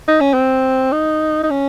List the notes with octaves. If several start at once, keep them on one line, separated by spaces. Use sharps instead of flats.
D#4
C#4
C4
D#4
D#4
C#4